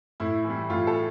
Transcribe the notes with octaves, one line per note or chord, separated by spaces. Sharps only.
A2 E4
E3
G3
A2 F4
A4